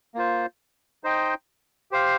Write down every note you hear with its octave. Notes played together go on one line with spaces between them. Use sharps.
A#3 F4 C5
D#4 C5 D#5 G5
G4 C5 F5